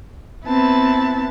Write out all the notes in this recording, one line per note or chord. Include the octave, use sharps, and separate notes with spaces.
B3 C4 E4 B4 A5